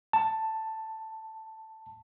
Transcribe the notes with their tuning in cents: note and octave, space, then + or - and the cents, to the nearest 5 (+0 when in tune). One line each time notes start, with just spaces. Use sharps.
A5 +5